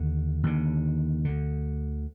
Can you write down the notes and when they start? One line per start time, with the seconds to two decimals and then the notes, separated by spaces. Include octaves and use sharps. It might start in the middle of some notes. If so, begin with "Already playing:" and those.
Already playing: D#2 D3
0.43 D#2 D3
1.25 D2 D3